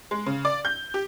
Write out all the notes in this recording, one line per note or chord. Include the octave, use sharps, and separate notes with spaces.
G#3
C#3
D5
G6
G4